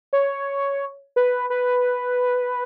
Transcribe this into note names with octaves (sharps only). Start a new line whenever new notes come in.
C#5
B4
B4